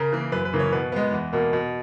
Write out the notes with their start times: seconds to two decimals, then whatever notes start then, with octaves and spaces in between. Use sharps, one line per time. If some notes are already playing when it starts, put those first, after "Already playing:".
Already playing: C#3 A#4
0.12 E3 A#3
0.32 F#2 B4
0.45 B4
0.53 C#3 E3 A#3
0.59 C#5
0.72 B2 B4
0.92 G#3 B3
1.12 E2
1.33 B2 A#3
1.53 B2